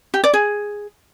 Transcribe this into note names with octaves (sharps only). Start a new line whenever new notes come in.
G4
D5
G#4